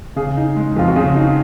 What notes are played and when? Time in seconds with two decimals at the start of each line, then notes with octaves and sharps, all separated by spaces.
0.16 C#3 G#4
0.37 D#4
0.56 G#3
0.76 F2 F4
0.88 F#4
0.96 C#3 G#4
1.16 D#4